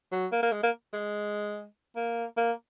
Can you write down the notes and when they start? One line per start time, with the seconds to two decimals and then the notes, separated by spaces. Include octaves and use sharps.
0.12 F#3
0.32 A#3
0.43 A#3
0.52 G#3
0.63 A#3
0.93 G#3
1.96 A#3
2.37 A#3